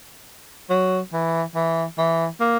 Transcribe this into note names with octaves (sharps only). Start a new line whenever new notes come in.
F#3
E3
E3
E3
A#3